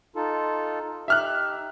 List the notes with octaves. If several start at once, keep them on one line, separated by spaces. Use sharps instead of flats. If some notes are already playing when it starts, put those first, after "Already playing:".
D#4 F4 A4
D#4 G4 E5 F6 F#6